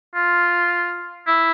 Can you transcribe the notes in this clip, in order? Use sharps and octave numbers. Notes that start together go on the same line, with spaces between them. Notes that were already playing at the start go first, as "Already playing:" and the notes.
F4
E4